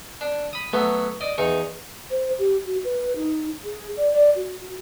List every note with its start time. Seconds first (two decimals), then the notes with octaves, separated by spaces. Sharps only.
0.21 D4
0.53 B5 D#6
0.73 F#3 A3 B3
1.21 D5 D#5
1.38 E2 D#4 C#6
2.11 C5
2.39 G4
2.66 F#4
2.84 B4
3.16 D#4
3.64 G#4
3.97 D5
4.11 D5
4.36 F#4